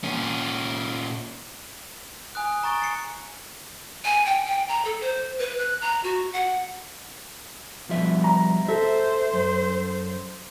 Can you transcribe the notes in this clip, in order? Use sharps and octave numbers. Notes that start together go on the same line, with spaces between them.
A#2 C#4
G#5 D#6 F#6
A#5 C#6 A6 D7 G7
A6 C7 C#7
G#5
G5
G5
A#5
A4
C5
B4
F#6
A#5
F#4
F#5
B2 F3 G3 E5
A#5
A4 C5 E5
F#2